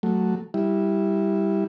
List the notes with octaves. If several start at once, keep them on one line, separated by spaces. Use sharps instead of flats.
F#3 A3
G3 E4